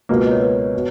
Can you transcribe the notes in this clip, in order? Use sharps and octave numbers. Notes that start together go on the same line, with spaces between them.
C#2 B2 A#3 B4
B4
D#5
C#5
B4
B2